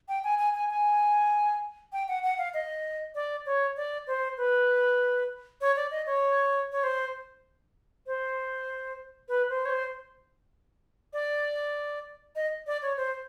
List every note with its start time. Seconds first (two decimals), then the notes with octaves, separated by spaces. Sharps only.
0.09 G5
0.24 G#5
0.39 G#5
0.55 G#5
0.70 G#5
1.93 G5
2.08 F#5
2.23 F#5
2.38 F5
2.54 D#5
3.15 D5
3.46 C#5
3.77 D5
4.07 C5
4.37 B4
5.61 C#5
5.76 D5
5.91 D#5
6.06 C#5
6.72 C#5
6.83 C5
8.07 C5
9.29 B4
9.49 C5
9.66 C#5
9.70 C5
11.13 D5
12.36 D#5
12.67 D5
12.82 C#5
12.97 C5